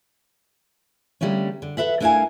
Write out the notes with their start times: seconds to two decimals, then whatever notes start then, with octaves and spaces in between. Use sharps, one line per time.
1.21 D3 G3 A3 A#3 C#4
1.62 D3
1.77 A4 B4 E5 F#5
2.01 A3 D4 E4 A#4 F5 G#5